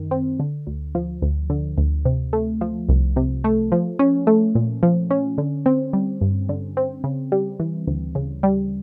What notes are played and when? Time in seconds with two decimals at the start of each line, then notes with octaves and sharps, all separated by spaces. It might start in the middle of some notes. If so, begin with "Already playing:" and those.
Already playing: F#2 D#3
0.11 C4
0.40 D3
0.67 D2
0.95 F3
1.22 D2
1.50 D3
1.78 D2
2.05 C3
2.33 A3
2.61 F3
2.89 C2
3.16 C3
3.44 A3
3.72 F3
3.99 C#4
4.27 A3
4.55 A#2
4.83 F3
5.11 C#4
5.38 D3
5.66 C4
5.93 G3
6.21 G2
6.49 D3
6.77 C4
7.04 C#3
7.32 G3
7.60 E3
7.87 D2
8.15 C#3
8.43 G3